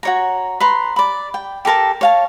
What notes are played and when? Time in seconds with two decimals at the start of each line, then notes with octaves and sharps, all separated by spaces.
0.03 F#4 C#5 A#5
0.60 B4 A#5 C6
0.96 D5 B5
1.34 G5
1.65 G4 A4 A#4 A5
2.01 C#5 F5 A5